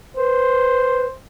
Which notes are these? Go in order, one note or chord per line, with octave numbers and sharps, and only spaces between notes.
B4 C5